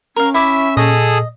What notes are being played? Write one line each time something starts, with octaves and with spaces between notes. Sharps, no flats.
C#4 A#4 F5
E4 E5 D6
A#2 G#4 A4 D#5 D#6